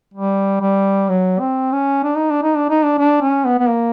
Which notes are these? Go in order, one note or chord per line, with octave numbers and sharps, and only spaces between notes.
G3
G3
F#3
C4
C#4
D4
D#4
D4
D#4
D4
D#4
D4
D4
C#4
B3
B3
A#3